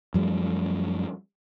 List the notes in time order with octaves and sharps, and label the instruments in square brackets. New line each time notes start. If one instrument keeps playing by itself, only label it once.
[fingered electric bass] F#2 F3 G3 A3